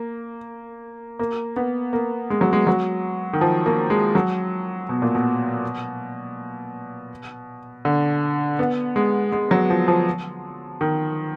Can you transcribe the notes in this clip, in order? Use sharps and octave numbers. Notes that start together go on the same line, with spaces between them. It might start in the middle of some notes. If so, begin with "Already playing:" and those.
Already playing: A#3
A#3
B3
A#3
G#3
F#3
G#3
F#3
D#3
F3
A#3
G#3
F#3
B2
A#2
B2
D3
B3
G#3
G#3
F#3
F3
F3
D#3